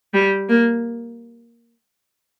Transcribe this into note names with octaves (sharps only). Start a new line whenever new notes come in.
G3
A#3